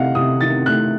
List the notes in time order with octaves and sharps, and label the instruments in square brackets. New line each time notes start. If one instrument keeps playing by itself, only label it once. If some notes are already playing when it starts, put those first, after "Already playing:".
Already playing: [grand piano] C3 D#3 A3 D#5 F5 F#5
C3 D#6
D#3 A6
A3 F#6